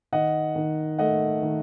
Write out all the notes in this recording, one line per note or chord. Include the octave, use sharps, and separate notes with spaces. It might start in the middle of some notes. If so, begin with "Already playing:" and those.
D#3 D#5 F#5
D#3
A3 D#5 F#5
D#3